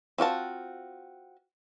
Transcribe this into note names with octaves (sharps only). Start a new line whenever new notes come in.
C4 F4 F#4 A5